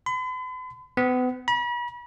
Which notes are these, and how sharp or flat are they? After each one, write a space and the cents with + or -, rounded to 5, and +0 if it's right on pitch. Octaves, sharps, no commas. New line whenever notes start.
B5 +45
B3 +35
B5 -40